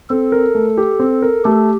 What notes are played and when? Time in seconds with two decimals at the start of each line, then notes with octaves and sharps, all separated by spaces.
0.10 C4 A4
0.32 A#4
0.55 A3
0.77 G4
0.99 C4
1.22 A#4
1.44 A3 G4